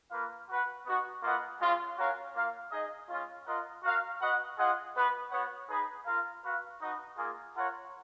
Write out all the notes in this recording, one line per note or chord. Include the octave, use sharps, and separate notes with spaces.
A#3 F4 B4 F5
F#4 B4 F#5
B3 D#4 F#4
A#3 F4 B4 D#5 F#5
G#3 C#4 F4
C#4 F#4 A#4 C#5 F5
A#3 F4 A#4 F5
D#4 G#4 D#5
G#3 C#4 F4
F4 A#4 D#5 F#5
F#4 A#4 F5
F#4 B4 D#5 F#5
F4 G#4 D#5 F#5
B3 F#4 B4
B3 F#4 C#5 F#5
D#4 G#4 B4
F4 A#4 F5
F#4 B4 F5
D#4 F#4 B4 D#5 F#5
A#3 F4 G#4
F4 A#4 C#5 F#5